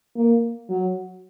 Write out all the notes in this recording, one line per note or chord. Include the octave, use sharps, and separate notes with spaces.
A#3
F#3